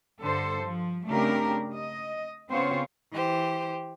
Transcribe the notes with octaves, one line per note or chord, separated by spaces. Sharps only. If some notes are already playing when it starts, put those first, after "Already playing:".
G2 D3 A4 C5
F3
C#3 A3 C4 D4 G4 A#4
D#5
C#3 B3 C4 F4 C5 C#5
E3 G4 C5